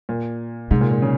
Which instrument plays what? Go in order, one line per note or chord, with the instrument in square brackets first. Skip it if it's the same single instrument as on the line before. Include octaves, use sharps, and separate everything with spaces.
[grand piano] A#2
[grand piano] G#2 [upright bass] C3
[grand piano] A#2
A#2
C#3